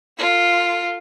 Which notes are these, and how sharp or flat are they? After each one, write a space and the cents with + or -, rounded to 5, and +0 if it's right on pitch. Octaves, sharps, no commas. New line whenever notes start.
F4 +0 A4 +40